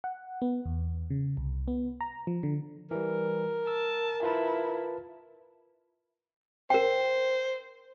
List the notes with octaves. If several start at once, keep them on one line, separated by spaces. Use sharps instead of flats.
F#5
B3
E2
C#3
C2
B3
A#5
F3
D3
E3 G3 A#4
A5 E6
E4 F4 B4 A5
A#4 C5 G5